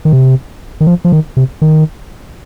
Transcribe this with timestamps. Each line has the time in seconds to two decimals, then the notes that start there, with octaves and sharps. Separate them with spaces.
0.05 D#3
0.13 C3
0.81 D#3
0.87 F3
1.05 F3
1.12 D#3
1.37 C3
1.62 D#3